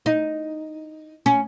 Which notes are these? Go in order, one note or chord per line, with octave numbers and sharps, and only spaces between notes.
D#4
C#4